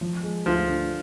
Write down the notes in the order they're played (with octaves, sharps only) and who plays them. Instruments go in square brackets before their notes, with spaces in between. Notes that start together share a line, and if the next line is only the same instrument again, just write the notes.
[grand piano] F3
G#3
[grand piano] D2 [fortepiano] F3
[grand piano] D3